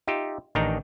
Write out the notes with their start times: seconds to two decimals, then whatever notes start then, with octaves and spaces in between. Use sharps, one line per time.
0.07 D#4 F4 G4 E5
0.55 A1 D#3 D4 D#4 G5 A#5